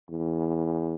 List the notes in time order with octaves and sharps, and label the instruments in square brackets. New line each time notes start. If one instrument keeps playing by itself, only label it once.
[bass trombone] E2